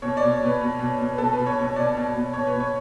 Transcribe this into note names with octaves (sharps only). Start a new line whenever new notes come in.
B2 C#5
D5
B2
C#5
B2 B4
B2
B2
B2
B4
B2 A4
B2 B4
C#5
B2 C#5
B2 D5
B2
B2
B2 C#5
B4
B2
C#5